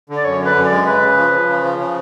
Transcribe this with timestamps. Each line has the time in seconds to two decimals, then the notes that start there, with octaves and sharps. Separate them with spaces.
0.09 D3
0.17 D5
0.25 F#2 C#5
0.40 D3
0.45 B4
0.55 F#2
0.66 D5
0.71 G#3
0.86 C#3 B4
1.02 C#3
1.17 F3
1.32 F3
1.47 C#3
1.63 F3
1.79 C#3